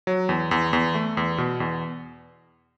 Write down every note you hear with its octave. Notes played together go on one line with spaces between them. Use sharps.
F#3
E2
E2
E2
A3
E2
B2
E2